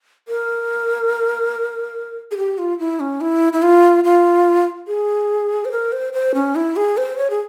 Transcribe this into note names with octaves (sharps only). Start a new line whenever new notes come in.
A#4
G#4
G4
F4
E4
C#4
E4
E4
F4
F4
G#4
C5
A#4
C5
C5
C#4
E4
G#4
C5
C#5
G#4